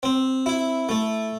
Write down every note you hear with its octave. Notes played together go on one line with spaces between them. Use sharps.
C4
E4
A3